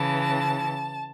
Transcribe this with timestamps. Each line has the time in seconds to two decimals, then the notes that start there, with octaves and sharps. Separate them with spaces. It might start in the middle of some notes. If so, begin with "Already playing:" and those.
Already playing: C#3 E3 A5